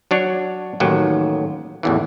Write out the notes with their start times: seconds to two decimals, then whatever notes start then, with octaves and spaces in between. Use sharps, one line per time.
0.11 F#3 D4 C#5
0.80 A1 D#2 D#3 F#3
1.83 A1 E2 E3